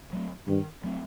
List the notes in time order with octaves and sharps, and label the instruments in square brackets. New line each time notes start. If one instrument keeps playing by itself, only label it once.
[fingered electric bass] F#3 A3 C4
[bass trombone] G2 [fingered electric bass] D#3
[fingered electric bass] F#3 A3 C4